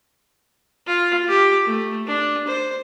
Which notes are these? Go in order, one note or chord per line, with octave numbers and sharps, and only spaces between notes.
F4
G4
A3
D4
C5